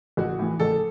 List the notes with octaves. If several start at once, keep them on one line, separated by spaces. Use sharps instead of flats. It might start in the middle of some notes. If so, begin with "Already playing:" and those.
A1 F#4
A2 E3
A1 A4